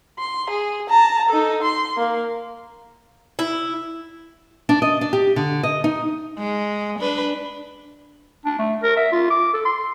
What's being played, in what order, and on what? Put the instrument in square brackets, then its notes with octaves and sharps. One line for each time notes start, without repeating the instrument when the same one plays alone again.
[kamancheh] C6
G#4
A5 A#5
D#4 A4
C6
A#3
[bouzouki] E4
[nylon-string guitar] D4
D#5
D4
G4
D3
D#5
D#4
[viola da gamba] G#3
D4 B4
[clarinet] D4
A3
A#4
E5
F4
D6
A4
C6